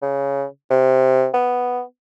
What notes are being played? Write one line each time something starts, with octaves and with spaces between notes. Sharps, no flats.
C#3
C3
B3